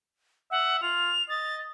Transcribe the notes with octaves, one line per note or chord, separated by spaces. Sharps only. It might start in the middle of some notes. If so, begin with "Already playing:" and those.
E5 F#5
F4 F7
D#5 A6